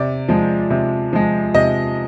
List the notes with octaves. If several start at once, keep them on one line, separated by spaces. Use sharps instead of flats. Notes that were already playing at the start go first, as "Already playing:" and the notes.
Already playing: C3 D5
F3 G#3
C3
F3 G#3
C3 D#5